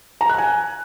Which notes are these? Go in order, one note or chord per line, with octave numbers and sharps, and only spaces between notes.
A#5
F#6
G#5